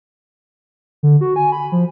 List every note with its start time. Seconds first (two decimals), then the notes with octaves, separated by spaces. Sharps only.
1.03 D3
1.21 F#4
1.36 G#5
1.52 B5
1.72 F3